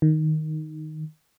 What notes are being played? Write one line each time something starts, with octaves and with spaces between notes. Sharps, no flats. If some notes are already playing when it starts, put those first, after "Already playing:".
D#3